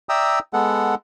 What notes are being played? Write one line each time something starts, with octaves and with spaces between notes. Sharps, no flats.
D5 E5 G5 A#5 D#6 E6
G#3 B3 A4 F#5